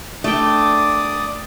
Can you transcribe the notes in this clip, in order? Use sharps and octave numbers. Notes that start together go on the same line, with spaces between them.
A3 D4 D5 G5 D6 D#6